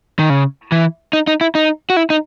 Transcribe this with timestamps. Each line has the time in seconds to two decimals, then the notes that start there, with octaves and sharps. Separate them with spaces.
0.19 D#3
0.30 C#3
0.72 E3
1.13 D#4
1.27 D#4
1.41 E4
1.55 D#4
1.90 F#4
1.97 E4
2.10 D#4